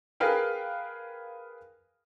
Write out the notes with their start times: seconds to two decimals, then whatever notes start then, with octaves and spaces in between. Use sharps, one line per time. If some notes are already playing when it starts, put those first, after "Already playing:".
0.20 G#4 A#4 B4 F5 G5